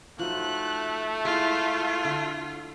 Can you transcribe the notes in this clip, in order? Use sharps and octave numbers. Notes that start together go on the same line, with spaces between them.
F3 F#3 A3 D#4 F#6
G#3 E4 F4
D3